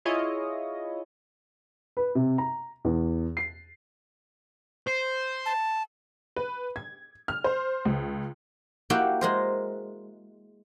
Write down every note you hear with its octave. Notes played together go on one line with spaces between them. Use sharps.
E4 F4 G#4 C#5 D#5
B4
C3
A#5
E2
C7
C5
A5
B4
G#6
F6
C5
C#2
A#3 E4 F#4 G4 F5 G5
G#3 A#4 C5